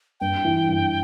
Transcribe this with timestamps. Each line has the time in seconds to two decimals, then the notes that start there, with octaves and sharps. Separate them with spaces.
0.20 G2 G5
0.45 E3
0.68 G2